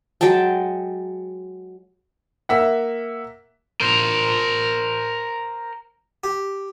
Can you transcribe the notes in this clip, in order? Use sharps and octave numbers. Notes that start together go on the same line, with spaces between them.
F#3 G#3 G5 A5
A#3 E5 F#5
A#4 C5
G4